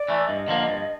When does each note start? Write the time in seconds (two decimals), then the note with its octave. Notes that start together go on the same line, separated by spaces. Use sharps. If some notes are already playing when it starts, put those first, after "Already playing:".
Already playing: D5
0.08 E3 A3
0.28 G2 D#5
0.48 D3 F3 A#3
0.68 G2